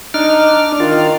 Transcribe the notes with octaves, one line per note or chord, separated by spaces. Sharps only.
D4 D#4 F6
D#3 F4